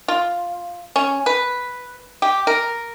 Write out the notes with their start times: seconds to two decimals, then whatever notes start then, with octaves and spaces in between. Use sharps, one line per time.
0.08 F4
0.96 C#4
1.26 B4
2.22 G4
2.47 A#4